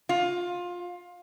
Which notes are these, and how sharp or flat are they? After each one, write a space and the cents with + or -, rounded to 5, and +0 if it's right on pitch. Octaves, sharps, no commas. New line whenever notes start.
F4 +20